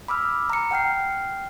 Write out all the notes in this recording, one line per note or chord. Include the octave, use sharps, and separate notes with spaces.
B5 D6 E6 F6
A#5 C#7
F#5 G5 F6 C7